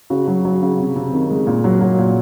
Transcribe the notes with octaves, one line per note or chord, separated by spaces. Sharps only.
C#3 F#4
F#3
F#3
C#3
C3
C3
D#3
G#3
A#2
F#3
F#3
A#2